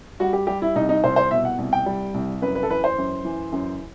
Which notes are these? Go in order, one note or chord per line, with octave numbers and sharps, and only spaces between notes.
G3 F#4
G4
G3 G4
E4
C2 D#4
D#4
C2 C5
C5
B2 E5
F#5
C2
G5
G3
C2
F#2 B4
B4
A4
E3 B4
C5
F#2
E3
F#2